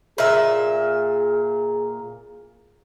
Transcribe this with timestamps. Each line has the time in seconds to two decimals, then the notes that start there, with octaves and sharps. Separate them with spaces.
0.18 A#2 G#4 E5